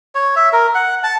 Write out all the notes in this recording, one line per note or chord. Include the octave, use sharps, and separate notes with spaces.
C#5
E5
A#4
F#5
A5